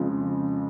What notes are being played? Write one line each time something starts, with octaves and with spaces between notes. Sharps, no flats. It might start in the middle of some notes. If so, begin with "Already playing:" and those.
Already playing: F2 C#3 F3 G#3